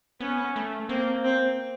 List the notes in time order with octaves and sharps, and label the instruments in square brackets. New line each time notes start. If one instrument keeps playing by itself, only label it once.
[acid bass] B3 [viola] C#4
[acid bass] A3
[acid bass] A#3 [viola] C4
[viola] C4